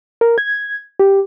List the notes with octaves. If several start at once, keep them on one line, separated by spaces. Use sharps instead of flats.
A#4
G#6
G4